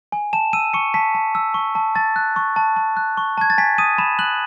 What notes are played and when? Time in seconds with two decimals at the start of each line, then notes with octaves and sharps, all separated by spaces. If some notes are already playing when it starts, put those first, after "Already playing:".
0.12 G#5
0.33 A5 E7
0.53 E6 D#7
0.74 C#6 C#7
0.94 A5 B6
1.15 A5
1.35 E6
1.54 C#6
1.75 A5
1.95 A5 A6
2.16 F#6
2.36 C#6
2.56 A5
2.76 A5
2.97 F#6
3.17 C#6
3.38 A5 G#6
3.50 A6
3.58 G#5 B6
3.78 D#6 D#7
3.98 B5 E7
4.19 F#6 F#7